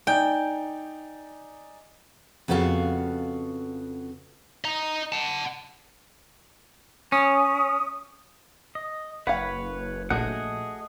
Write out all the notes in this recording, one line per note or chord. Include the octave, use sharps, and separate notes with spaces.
D#4 D5 G5 G#5
F2 C#3 B3 F#4 A4 F5
D#5 A#5
F#5 A5
C#4 D#6
D#5
F#1 B4 C#5 F5 F#5
A#1 A3 F#4 G#4 D#5 F#5